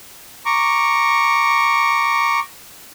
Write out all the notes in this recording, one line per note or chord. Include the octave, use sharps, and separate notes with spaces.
A#5 C#6 D6